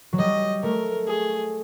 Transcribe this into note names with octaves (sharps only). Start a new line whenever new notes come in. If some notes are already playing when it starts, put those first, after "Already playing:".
F#3
G3 D#5
A3 A#4
G#4